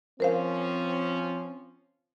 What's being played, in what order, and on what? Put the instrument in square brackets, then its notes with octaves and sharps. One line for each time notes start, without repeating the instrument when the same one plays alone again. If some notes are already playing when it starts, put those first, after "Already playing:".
[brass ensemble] F3 C#4 [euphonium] C4 [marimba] A#4 C5 F5